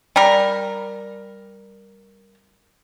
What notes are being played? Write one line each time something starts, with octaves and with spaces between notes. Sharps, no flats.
G3 A#4